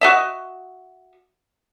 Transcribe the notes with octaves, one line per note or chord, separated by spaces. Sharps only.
F#4 D#5 E5